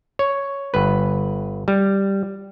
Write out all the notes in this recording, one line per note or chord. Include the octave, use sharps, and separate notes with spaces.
C#5
G1 B4
G3